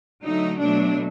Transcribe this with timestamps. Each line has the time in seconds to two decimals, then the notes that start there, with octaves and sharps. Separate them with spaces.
0.24 D3 F#3 A3 D#4
0.61 B2 F#3 A3 D4